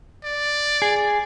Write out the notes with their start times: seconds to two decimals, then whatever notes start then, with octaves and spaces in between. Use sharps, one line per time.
0.24 D5
0.82 G#4